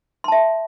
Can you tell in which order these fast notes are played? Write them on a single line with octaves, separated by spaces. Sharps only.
C6 A5 E5